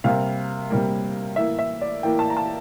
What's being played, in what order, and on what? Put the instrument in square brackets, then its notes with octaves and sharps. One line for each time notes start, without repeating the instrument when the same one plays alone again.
[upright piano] C3 G3 A#3 F5
C3 G3 A#3
A2 E3 A#3 E5
E5
D5
A2 E3 A#3 G5
A5
A#5
A5